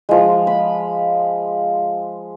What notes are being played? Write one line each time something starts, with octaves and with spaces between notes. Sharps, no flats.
F3 G#3
B5